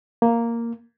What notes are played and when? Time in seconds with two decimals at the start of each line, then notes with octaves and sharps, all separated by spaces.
0.22 A#3